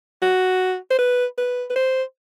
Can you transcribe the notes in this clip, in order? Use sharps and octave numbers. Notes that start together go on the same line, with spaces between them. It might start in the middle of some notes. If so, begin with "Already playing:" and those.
F#4
C5
B4
B4
B4
C5